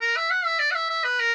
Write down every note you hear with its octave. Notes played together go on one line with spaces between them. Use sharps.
A#4
E5
F#5
E5
D5
F#5
E5
E5
B4
A#4